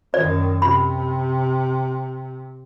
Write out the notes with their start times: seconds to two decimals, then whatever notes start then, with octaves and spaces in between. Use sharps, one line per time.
0.14 F#2 D#3 D5
0.62 C3 B5